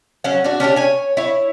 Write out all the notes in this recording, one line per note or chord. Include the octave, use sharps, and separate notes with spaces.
F#3 C#4 F#5
D4 F#4
C#4 D4 F4 G4
C#5 G#5
E4 C#5